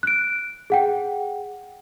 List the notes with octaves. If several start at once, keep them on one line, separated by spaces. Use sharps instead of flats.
F#6 D7
G#4 F#5 G5